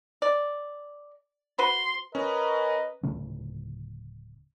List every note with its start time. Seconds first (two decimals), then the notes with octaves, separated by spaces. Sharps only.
0.22 D5
1.59 F#4 B4 C5 C6
2.15 C#4 A#4 B4 D#5
3.03 D1 C#3 A3 C#4